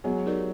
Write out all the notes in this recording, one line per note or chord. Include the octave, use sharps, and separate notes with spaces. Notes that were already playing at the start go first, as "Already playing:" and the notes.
F#3 G#3 B3
D#4 G4 A#4 D5